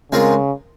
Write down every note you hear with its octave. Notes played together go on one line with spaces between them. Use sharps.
C#3 G#3 C4 F4 A#4